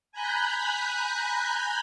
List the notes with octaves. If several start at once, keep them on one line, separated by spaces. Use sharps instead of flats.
G#5 A#5 B5 F#6 G6